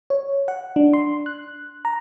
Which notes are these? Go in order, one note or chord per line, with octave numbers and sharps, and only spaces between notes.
C#5
F#5
D4
C6
F#6
A#5